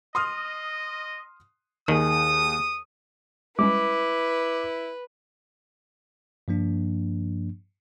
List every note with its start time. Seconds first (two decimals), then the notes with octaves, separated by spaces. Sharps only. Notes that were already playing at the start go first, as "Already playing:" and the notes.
0.15 D#5 C6 D#6 F6
1.88 D#2 D#3 G#4 D#6
3.59 G3 G#3 C#4 E4 B4 D6
6.48 G2 F3 A#3 D4